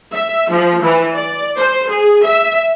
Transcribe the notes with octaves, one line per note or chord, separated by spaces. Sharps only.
E5
F3
E3
D5
C5
G#4
E5